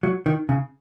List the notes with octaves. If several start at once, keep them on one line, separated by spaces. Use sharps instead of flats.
F#3
D#3
C#3